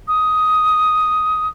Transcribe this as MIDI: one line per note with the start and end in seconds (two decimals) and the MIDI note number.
0.08 1.48 87